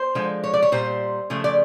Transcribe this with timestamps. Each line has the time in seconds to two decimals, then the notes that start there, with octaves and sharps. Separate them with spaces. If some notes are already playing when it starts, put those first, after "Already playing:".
Already playing: C5
0.15 D3 F3 G#3
0.44 C#5
0.54 D5
0.62 C#5
0.72 A#2 G3 C5
1.30 C#3 F3 A3
1.44 D5